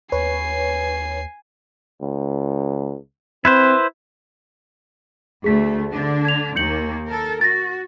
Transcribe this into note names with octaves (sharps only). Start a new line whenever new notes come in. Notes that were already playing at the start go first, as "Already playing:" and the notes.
D#2 B4 C#5 G#5 C7
C#2
C4 E4 B4 C5
D2 A3 G#4 B6
D3 D4
G#6 F7
D#2 A#3 G6 C#7 F#7
A4 A#4
F#4 A6 A#6